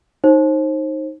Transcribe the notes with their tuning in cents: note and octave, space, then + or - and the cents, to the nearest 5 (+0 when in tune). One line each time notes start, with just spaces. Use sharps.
D#4 +0 C5 +35